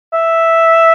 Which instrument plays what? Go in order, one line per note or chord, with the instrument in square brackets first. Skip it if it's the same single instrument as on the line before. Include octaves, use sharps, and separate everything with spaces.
[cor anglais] E5